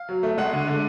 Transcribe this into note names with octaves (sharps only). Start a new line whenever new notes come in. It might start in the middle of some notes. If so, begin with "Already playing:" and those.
Already playing: F5
F#3
A3
G#3 F#5
D3
D3